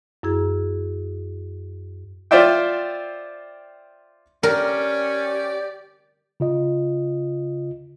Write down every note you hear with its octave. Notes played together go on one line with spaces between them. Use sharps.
F#2 E4 G#4
F4 C5 D5 E5 G5
C#4 G4 A#4 D5
C#3 F4 D#5